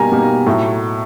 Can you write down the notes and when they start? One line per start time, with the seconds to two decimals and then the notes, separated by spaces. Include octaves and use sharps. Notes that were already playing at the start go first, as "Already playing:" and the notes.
Already playing: B2 G3 A#3 G#5 A#5
0.12 B2 G3 A#3
0.46 A2 F#3 A3